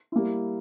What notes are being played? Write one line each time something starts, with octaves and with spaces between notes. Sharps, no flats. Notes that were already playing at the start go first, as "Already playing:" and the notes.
G3 A#3 E4